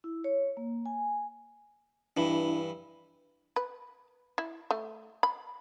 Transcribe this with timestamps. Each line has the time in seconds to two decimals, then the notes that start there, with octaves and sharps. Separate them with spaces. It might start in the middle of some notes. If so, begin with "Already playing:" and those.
0.04 E4
0.24 C#5
0.57 A#3
0.86 G#5
2.17 G2 E3 D4 E4
3.56 B4
4.38 E4
4.71 A3
5.23 B5